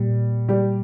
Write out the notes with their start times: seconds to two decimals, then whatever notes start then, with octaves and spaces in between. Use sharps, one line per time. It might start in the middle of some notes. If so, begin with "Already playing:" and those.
Already playing: A#2 G3
0.49 G3 G4